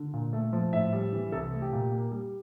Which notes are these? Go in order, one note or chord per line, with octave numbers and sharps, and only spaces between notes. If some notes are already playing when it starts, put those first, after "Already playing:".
Already playing: D3
A#2
A3
F3
A2 E5
G3
E3
C2 A4
A3
G4
A#2
A#3
G3